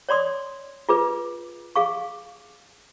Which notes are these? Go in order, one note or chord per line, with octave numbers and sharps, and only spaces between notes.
C#5 D5 C6 D#6
F4 G#4 B4
G#4 F5 C#6